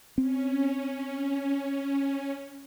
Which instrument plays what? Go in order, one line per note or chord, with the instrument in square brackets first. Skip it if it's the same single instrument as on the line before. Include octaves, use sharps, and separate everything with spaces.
[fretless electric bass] C4 [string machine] C#4